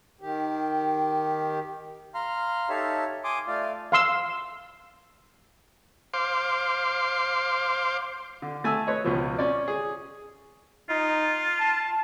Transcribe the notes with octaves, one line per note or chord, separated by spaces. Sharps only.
D#3 G4
F5 A#5 C6 F6
D#4 G4 A4 C#5 E5 F5
G#5 C6 D6 D#6
A3 F4 D5 F5
F5 C6 E6
C5 F5 C6 D6
D3
A3 G#5 A5 E6
B4 C#5 D#5
C#2 B2 F3
C#4 D5
G#4
D#4 F4
A5